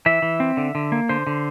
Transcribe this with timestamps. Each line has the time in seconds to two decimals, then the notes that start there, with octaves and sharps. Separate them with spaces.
0.06 E3 E5
0.22 E3
0.40 C4
0.57 D3
0.75 D3
0.92 A#3
1.09 D3 C5
1.27 D3